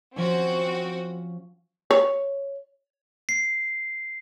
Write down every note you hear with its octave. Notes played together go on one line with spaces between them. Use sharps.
F3 C4 C#4 F#4
C#5
C7